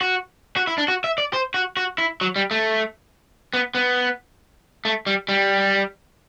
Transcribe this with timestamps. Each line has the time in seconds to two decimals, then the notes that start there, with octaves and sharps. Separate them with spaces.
0.01 F#4
0.56 F#4
0.67 E4
0.78 D4
0.88 F#4
1.04 E5
1.18 D5
1.33 C5
1.54 F#4
1.77 F#4
1.98 E4
2.21 F#3
2.36 G3
2.51 A3
3.54 B3
3.75 B3
4.85 A3
5.07 G3
5.29 G3